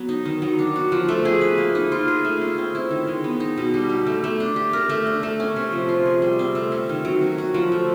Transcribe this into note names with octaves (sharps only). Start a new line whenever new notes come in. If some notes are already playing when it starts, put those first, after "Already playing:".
Already playing: F#3 B3
D#4
D#3
F#3
D4
F#4
F3
A3
G#4
B4
A#3
D#4
F4
G#4
A3
C#4
C4
E4
D#3
G#3
B3
D#4
B2
G3
G4
A3
A3
D4
G4
A#4
A3
D4
A3
C#4
C3
F3
F4
G#4
G3
C4
A3
C#4
D#3
F#3
C#4
F#4
F3
A3